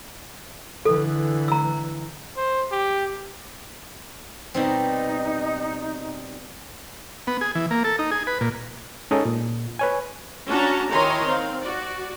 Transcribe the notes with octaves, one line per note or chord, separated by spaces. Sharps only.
D3 E3 A4
A#5 E6
C5
G4
B2 G3 C4 D#4
B3
G#4
E3
A#3
A4
D#4
G#4
B4
A#2
G#3 C#4 D#4 A4 D#5
A#2
B4 C#5 G#5
C#4 D4 F#4 A5 A#5
D#3 E4 C#5 G#5 A#5 C6
C4 F5
F#4 D5